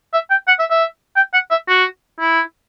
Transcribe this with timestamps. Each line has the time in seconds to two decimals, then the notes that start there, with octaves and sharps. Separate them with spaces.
0.13 E5
0.31 G5
0.48 F#5
0.59 E5
0.71 E5
1.16 G5
1.34 F#5
1.51 E5
1.69 F#4
2.20 E4